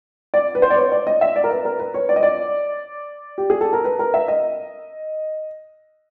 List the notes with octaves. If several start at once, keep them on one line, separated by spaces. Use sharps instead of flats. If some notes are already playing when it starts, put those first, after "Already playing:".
D5
B4
C5
D5
C#5
D5
D#5
E5
D5
A#4
B4
A#4
B4
C#5
D5
D#5
D5
G4
G#4
A4
A#4
B4
A#4
E5
D#5